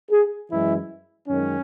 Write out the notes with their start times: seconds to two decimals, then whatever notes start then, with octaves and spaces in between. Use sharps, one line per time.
0.10 G#4
0.50 F#2 E3 G#3 E4
1.28 F#2 D#3 G#3 C#4